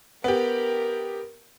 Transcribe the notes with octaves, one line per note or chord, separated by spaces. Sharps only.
B3 G4 A#4